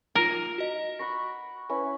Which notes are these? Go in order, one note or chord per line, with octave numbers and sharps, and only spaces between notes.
D#4 F4 A#4
F#4 D#5
F#5 B5 C#6 A#6
C#4 E4 B4